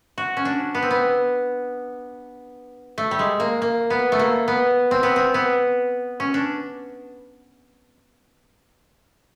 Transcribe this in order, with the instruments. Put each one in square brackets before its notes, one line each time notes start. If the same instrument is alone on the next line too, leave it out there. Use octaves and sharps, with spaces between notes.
[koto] F#4
C#4
D4
B3
C4
B3
A3
G3
G#3
A#3
A#3
B3
A3
A#3
B3
C4
B3
C4
B3
C#4
D4